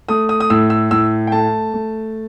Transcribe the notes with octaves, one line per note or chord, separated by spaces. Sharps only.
A3 D#6
D#6
D#6
A2 E6
E6
A2 E6
G5
A3 A5
A3